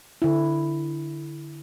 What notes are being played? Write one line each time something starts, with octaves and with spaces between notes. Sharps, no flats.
D3 E4